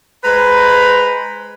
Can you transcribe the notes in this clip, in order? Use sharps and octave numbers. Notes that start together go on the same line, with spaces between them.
G#3 B4 C5 A#5 B5